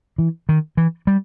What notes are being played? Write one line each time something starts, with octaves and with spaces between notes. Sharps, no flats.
E3
D#3
E3
G3